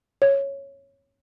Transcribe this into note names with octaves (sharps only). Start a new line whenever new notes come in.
C#5